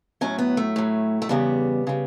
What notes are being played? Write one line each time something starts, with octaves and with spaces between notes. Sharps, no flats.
A2 F#3 C#4
B3
A3
A2 F#3
A3
E2 C#3 G3 B3
C#3 G3